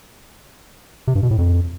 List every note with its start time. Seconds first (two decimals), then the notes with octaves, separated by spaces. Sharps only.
1.08 C3
1.15 G2
1.23 B2
1.31 A2
1.38 F2